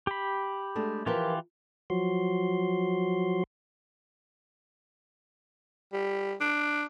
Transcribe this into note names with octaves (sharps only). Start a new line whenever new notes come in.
G4 B5
G#3 A3 D4
E3 F3 F4 G4 A#4 B4
F3 F#3 F#4 C6
G3
D4